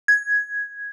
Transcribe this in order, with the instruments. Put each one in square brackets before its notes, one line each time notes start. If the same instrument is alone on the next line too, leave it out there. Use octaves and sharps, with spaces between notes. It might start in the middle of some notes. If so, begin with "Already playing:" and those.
[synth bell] G#6